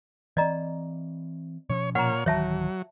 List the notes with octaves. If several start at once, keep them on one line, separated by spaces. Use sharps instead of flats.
E3 C4 D5 D#5 A#5
B2 F3 C#4 C#5
A#2 C#5 F#5 A#5 F6
D1 D#3 E3 F#3 C#5 E5 A5